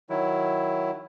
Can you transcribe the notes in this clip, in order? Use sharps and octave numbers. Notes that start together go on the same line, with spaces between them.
D#3 F#3 E4